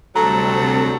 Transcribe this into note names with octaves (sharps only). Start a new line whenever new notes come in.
D2 C3 F#3 G3 C4 A4 A#5